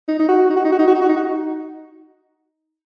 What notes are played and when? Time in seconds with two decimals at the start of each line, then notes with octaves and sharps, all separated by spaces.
0.08 D#4
0.19 D#4
0.28 F#4
0.50 D#4
0.56 F#4
0.64 D#4
0.72 F#4
0.79 D#4
0.87 F#4
0.95 D#4
1.01 F#4
1.09 D#4
1.16 F#4
1.24 D#4